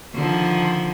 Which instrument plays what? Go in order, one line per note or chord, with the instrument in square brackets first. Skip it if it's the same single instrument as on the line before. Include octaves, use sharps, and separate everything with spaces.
[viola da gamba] D3 D#3 F3